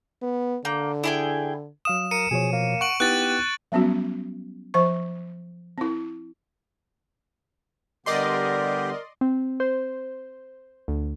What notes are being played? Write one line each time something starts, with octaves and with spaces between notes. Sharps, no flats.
B3
D3 A#3 G6
E4 G#4 G5
F#3 F5 D#6 E7
A#4 C#7 D#7
B2 F3 G#4 C#5
A#3
F#5 C#6 D7 F#7
B3 D#4 E4 G4 F#6 A6
F#3 G3 B3 C#4 F#4
F3 C5 C#6
C4 E4
D3 G3 B3 G4 A#4 D5 D#5 C6
C4
C5
D2